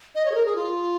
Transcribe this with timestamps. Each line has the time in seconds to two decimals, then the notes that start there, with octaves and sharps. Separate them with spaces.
0.15 D#5
0.25 C#5
0.32 G#4
0.35 A#4
0.46 G#4
0.56 F4